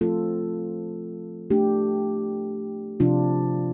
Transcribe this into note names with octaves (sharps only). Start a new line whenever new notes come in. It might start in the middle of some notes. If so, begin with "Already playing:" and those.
F3 A3 C4 F4 A4
A3 D4 G4
C3 F3 D4 F4